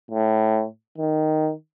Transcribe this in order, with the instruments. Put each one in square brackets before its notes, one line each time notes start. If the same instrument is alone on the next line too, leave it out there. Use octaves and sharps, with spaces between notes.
[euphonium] A2
D#3